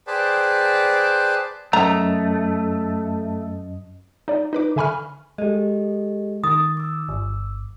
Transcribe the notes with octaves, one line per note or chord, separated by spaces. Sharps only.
G#4 B4 C5 D5 G5 A5
F#2 A3 D#5 A#5
D#4 D5
D#4 B4 D6
D3 E5 G#5 B5 C#6 F6
G#3 G4 A4 D#5
D#3 D#6 A6
D6 E6
G1